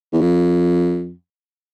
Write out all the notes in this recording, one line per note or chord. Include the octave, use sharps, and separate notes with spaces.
E2
F2